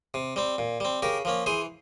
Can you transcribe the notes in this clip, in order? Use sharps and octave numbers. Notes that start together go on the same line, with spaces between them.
C3
G3 C4
A#2
G3 C4
C#3 G4 A#4
F3 A#3 C#4
E3 G#4 C5